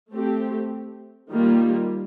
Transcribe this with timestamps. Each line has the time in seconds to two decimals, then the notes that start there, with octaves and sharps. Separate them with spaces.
0.13 A3 C4 G4
1.31 D#3 G3 A#3 F4